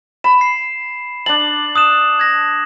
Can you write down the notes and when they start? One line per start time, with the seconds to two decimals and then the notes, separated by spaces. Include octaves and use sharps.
0.24 B5 E7
0.41 C7
1.26 D4 A5 F#7
1.76 D#6 F#6 E7
2.19 G#6 A#6